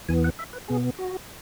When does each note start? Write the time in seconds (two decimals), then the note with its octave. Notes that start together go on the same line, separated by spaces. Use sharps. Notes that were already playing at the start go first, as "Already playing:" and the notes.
0.08 E2 E3 B3 G#5
0.24 F#5
0.39 E5
0.53 B4
0.68 B2 B3 G#4
0.99 F#4